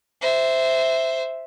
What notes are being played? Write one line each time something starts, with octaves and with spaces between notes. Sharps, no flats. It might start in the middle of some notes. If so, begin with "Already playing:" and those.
C5 E5